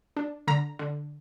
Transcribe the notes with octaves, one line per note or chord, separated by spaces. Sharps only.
D4
D3 A#5
D3